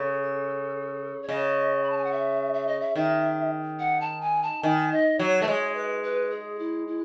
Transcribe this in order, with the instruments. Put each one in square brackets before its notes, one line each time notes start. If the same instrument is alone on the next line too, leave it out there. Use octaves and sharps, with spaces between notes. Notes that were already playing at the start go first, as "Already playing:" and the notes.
Already playing: [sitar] C#3 [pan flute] A4
[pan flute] C#5
[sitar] C#3 [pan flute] D#5
[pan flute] B5
A5
G#5
F#5
E5
E5
D#5
E5
[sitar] D#3 [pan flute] E5
[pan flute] F#5
A5
G#5
A5
[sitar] D#3 [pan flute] G#5
[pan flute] D#5
[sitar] F#3 [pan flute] C#5
[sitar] A3 [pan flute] B4
[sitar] G#3 [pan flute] C#5
[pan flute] B4
B4
G#4
E4
E4